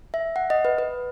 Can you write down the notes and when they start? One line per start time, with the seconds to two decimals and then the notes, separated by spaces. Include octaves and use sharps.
0.14 E5
0.36 F#5
0.50 D#5
0.65 B4
0.78 B4